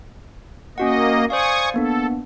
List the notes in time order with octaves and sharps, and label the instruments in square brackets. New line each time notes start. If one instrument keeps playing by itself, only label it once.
[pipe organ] A#3 D#5 [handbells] C#4 F#4 F#5
[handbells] C5 D5 F5 [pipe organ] G#5 C#6 D#6
[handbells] A#3 B3 D4 [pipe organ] A4